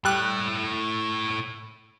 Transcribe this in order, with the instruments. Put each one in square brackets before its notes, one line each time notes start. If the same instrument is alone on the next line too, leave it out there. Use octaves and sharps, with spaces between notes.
[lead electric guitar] A2 A3 [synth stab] G3 F#6